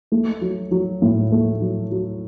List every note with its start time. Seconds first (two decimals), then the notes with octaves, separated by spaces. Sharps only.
0.12 A3
0.41 F#3
0.71 F#3
1.02 A2
1.32 A3
1.61 F#3
1.91 F#3